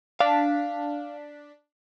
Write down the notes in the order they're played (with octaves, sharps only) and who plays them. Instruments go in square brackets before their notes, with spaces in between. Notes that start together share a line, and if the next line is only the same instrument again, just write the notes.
[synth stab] D4 B6 [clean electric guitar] F5